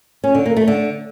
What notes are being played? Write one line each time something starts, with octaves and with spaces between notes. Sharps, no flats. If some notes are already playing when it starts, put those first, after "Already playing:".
C#4
D3
A#3
A3
D3